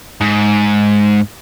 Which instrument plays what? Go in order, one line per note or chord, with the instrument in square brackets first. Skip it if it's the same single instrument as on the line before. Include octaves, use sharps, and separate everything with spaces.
[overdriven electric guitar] G#2